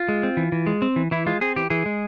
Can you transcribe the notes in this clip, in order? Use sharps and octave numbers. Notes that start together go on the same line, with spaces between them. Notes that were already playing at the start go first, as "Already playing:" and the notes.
Already playing: F4
G#3
C4
E3
E3
G#3
C4
E3
E3 E4
G#3 F4
C4 G#4
E3 G4
E3 G#4
G#3